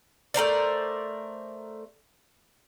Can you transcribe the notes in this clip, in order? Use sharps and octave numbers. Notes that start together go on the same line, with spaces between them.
A3 A#4 C5 D5